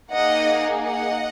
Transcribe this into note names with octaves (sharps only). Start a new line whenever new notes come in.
A#3 D#4 G#4 D#5 F#5
D#5 F#5